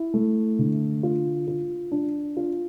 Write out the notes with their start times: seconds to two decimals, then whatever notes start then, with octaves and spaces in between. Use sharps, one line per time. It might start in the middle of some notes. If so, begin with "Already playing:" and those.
Already playing: E4
0.14 A3
0.59 D3
1.03 F4
1.48 F4
1.92 D4
2.37 F4